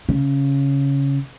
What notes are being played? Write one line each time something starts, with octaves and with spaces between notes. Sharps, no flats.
C#3